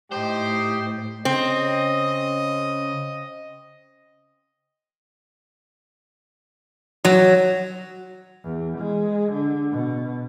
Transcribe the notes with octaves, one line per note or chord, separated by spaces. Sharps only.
A2 D#4 G4 C5 D#5 G5
C#3 C4 D#5
F#3
E2
G#3
D3
B2